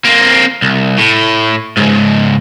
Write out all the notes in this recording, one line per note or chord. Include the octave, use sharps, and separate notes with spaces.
A#3 C4
C2
A2
C#2 G#2